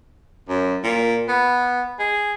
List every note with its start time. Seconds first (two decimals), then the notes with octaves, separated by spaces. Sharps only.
0.49 F#2
0.84 A#2
1.29 B3
1.99 G#4